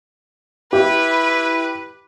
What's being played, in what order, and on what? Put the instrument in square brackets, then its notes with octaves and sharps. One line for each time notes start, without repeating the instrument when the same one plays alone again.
[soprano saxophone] E4 [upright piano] G4 [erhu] B4